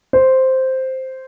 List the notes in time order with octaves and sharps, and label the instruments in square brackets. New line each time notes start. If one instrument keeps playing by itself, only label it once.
[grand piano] C5